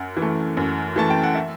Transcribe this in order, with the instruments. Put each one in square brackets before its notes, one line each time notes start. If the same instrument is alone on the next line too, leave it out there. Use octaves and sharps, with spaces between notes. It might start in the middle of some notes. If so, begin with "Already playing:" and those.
Already playing: [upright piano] F#2 F#5
E3
A3
F#2
E3 A3 A5
G5
F#5
E5